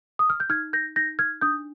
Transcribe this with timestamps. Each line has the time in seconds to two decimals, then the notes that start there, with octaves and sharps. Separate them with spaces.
0.19 D#6
0.30 F6
0.40 G6
0.49 D#4 F6 G#6
0.73 G6 A#6
0.96 D#4 G6 A#6
1.19 F6 G#6
1.41 D4 D#6 G6